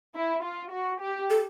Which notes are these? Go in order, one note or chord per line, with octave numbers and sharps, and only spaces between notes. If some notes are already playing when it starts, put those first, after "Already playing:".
E4
F4
F#4
G4
A4